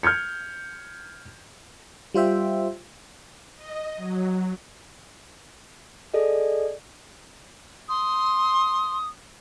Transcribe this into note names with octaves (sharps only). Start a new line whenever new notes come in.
F6 G6 G#6 C#7
G3 F4 C5 E5 G5
D#5
F#3
G#4 A4 D5 D#5
C6 D#6